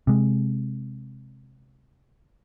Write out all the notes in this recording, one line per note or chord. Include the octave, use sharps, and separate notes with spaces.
C3 G#3